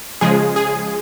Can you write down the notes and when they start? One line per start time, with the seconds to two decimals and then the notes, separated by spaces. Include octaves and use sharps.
0.21 C#3 F3 G#3 G#4
0.56 G#4